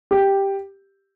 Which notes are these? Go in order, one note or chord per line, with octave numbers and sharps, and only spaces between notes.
G4